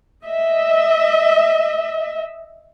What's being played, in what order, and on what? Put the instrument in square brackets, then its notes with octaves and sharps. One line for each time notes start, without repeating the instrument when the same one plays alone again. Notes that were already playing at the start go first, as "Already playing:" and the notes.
[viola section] D#5 E5